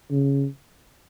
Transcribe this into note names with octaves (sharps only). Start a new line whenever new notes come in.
C#3